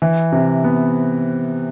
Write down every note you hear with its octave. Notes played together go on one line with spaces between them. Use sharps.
E3
C3
B3